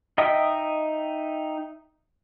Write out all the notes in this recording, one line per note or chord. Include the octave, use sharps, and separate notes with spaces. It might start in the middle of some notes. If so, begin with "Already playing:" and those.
D#4 D#5 E5 G5 D#6